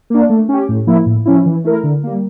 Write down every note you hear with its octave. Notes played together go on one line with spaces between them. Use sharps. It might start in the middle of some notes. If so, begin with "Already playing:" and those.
A#3 D4
A3
C#4 G4
A2
F3 A#3 E4
A2
F3 C#4 E4
E3
A3 E4 A#4
D3
G3 A#3